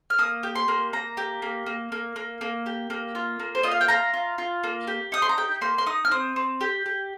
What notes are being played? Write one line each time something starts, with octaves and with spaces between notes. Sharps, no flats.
F6
A#3 D#6
G4
C6
A#3
A#3 A#5
G4
A#3
A#3
A#3
A#3
A#3
G4
A#3
F4
A#3
C5
F4 D#5
F5
G5
F4 A#5
F4
F4
A#3
G4
D#4 D#6
C6
A#5
G4 G5
A#3 C6
C6
D#4 D#6
F6
C4 D#6
C4
G4
G4